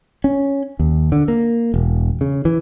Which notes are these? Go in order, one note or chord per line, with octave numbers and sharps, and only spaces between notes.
C#4
D#2
D3
A#3
E1
C#3
E3